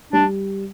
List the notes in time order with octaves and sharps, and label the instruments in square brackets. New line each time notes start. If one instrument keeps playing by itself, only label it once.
[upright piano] G3 [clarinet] D4